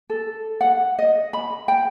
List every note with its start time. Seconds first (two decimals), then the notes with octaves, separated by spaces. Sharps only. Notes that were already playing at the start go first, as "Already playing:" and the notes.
0.10 A4
0.61 F#5
0.99 D#5
1.33 B5
1.68 G5